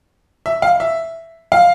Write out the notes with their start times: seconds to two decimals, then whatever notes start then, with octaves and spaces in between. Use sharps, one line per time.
0.46 E5
0.62 F5
0.80 E5
1.52 F5